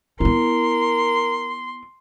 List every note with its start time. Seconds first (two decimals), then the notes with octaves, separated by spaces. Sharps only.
0.20 B3 E4 A#4 C6